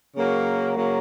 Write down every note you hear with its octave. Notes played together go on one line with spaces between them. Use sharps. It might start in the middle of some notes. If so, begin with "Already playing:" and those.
C#3 F#3 A#3
C#3 F#3 A#3